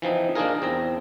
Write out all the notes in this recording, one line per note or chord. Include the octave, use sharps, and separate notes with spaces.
E3 F3 C4 D#4
A#3 D4 D#4 F4 G#4 A#4
E2 C4 A#5